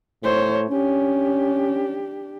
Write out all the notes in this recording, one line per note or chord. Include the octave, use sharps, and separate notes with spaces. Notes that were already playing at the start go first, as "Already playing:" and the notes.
A2 C5 C#5
C#4 D4 G4